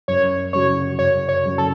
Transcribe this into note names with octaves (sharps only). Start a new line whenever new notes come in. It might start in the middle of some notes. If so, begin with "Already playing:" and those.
F#2 C#5
C#3 F#3 C#4 F#4 C#5
F#2 C#5
C#5
C#3 F#3 C#4 F#4
A4